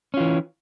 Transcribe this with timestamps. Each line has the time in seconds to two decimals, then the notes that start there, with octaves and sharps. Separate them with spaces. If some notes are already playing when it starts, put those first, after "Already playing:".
0.14 C#4
0.17 F4
0.20 E3